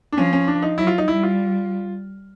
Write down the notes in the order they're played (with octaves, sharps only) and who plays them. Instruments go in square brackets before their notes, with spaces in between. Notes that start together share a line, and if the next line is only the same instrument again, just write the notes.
[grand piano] D4
[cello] F3 [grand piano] C#4
[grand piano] C#4
D4
D#4
[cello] F#3 [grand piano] E4
[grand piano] F4
D#4
[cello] G3 [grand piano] E4
[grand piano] F4